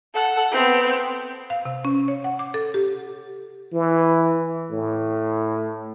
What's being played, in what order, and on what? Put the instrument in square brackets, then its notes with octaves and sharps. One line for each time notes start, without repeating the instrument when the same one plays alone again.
[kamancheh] A4 F#5
B3 C4
[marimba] F5
C3
C#4
C#5
F#5
D6
A4
G4
[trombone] E3
A2